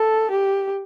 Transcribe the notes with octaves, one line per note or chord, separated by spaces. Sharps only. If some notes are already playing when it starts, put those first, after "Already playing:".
Already playing: A4
G4